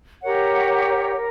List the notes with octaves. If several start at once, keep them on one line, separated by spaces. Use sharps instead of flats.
G4 A#4 C#5 F#5
A#4